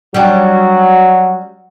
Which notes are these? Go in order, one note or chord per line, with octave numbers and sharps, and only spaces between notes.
F#3 G3 C#4 D4 F#4